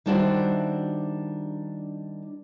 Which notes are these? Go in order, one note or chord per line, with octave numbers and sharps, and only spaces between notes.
D#3 G3 D4 E4 F#4 C5